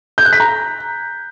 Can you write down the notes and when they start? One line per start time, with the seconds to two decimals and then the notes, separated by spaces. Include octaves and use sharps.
0.18 G6
0.25 F#6
0.33 B6
0.40 A#5